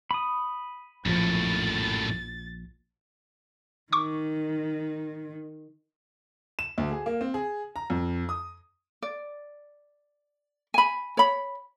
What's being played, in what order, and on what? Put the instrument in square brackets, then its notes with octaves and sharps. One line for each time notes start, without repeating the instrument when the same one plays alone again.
[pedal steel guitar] B5 D#6
[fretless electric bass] A#1 F3 [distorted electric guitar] F#2 A2 [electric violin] A6
[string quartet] D#3 [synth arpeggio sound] C#6 D6
[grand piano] E7
D2
G#4
A#3
C4
G#4
A#5
F2
D#6
[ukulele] D5
G#5 B5
C#5 B5